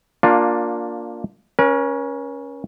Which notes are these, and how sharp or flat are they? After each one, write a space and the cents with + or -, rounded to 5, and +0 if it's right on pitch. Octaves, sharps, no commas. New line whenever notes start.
A#3 +0 D4 +0 F4 +20
C#4 +0 A#4 +45